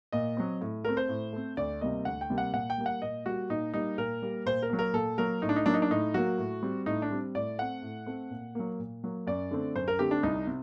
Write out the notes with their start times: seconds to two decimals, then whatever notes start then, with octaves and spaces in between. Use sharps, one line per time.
0.12 A#2 D#5
0.37 F#3 C4
0.61 A2
0.85 A3 C4 A#4
0.97 C5
1.09 A2
1.33 A3 C4
1.57 D2 D5
1.81 C3 G3 A#3 D#5
2.05 D2 F#5
2.21 G5
2.30 C3 G3 A#3
2.38 F#5
2.53 A#2 F#5
2.70 G5
2.78 G3 A#3
2.86 F#5
3.02 A#2 D#5
3.26 G3 A#3 F#4
3.49 A#2 D#4
3.74 G3 A#3 D#4
3.98 A#2 A#4
4.22 G3 A#3
4.46 A#2 C5
4.62 A#4
4.70 F#3 A#3
4.79 A#4
4.94 A#2 A4
5.18 F#3 A#3 A#4
5.42 A2 D#4
5.49 D4
5.56 D#4
5.66 F#3 A#3 D4
5.74 D#4
5.82 D4
5.90 A2 D#4
6.14 F#3 A#3 F#4
6.38 A2
6.63 G3 C4
6.86 A2 D#4
7.02 D4
7.10 G3 C4
7.35 A2 D5
7.58 A3 C4 F#5
7.82 A2
8.06 A3 C4
8.31 A#2
8.55 F#3 A#3
8.79 A#2
9.04 F#3 A#3
9.27 F#2 D5
9.51 D3 A3 C4
9.75 F#2 C5
9.88 A#4
9.99 D3 A3 C4 G4
10.11 D4
10.23 C2 D#4
10.47 C3